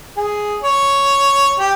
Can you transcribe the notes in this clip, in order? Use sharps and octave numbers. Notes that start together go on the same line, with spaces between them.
G#4
C#5
G4